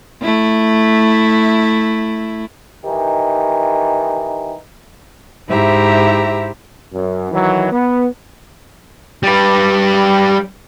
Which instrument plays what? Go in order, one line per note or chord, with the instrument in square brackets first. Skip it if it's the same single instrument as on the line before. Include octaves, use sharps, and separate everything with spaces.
[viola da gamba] A3 E4
[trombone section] D#3 E3 D#4 G4
[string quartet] G#2 E4 G4 C5 E5 A#5
[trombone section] F#2
D#3 E3 F#3
B3
[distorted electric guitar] G3 B4